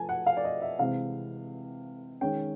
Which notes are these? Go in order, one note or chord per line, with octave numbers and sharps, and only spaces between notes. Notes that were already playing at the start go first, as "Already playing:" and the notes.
Already playing: F3 A3 F4 G#5 A5
F#5
F5
D5
D#5
E5
C3 E3 G#3 C4 F5
D#3 G#3 C#4 G5